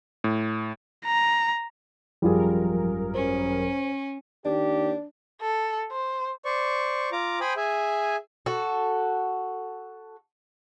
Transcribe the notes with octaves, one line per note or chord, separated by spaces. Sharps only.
A2
A#5
G#1 F#2 F3 G3 F4 G#4 A#4
C#4 C5
D#2 D4 G4
A4
C5
C5 D5 C#6
F4 A#5 D6
C5 G5 G#5 B5 D#6
G#4 E5 G#5
F#4 A4